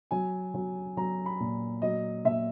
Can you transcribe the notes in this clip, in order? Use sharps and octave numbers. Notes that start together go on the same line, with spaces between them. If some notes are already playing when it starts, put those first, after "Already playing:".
F#3 G#5
F#3
F#3 A#5
B5
A#2
F#3 D#5
A#2 E5